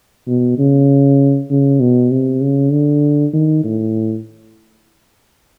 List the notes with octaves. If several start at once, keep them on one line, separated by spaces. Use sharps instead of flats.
B2
C#3
C#3
B2
C3
C#3
D3
D#3
A2